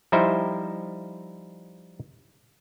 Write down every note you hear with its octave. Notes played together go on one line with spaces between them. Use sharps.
F3 G3 D#4 E4 C5 E5